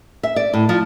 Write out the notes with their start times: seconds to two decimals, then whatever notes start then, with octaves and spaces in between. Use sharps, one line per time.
0.23 E5
0.36 D5
0.54 A2
0.69 F3